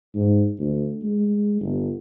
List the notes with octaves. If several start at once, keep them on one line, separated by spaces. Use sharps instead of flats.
G#2
D2
G#3
G1